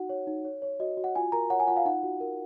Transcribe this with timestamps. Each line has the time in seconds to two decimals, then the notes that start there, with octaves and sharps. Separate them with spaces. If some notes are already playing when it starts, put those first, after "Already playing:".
Already playing: D#4 F#4 F#5
0.09 C#5
0.27 D#4
0.45 C#5
0.62 C#5
0.80 F#4 D#5
0.97 F#4
1.04 F#5
1.15 F4 G#5
1.32 A#4 A#5
1.50 C#5 F#5
1.60 G#5
1.67 F4 F#5
1.76 F5
1.85 D#4 F#5
2.03 F#4
2.21 A#4